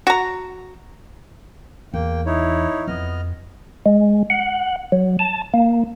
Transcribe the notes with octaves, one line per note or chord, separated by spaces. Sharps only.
F#4 A#5
E2 A#3 G5
D#4 E4 C#5
F2 B3 D#5 F6
G#3
F#5
F#3
A5
A#3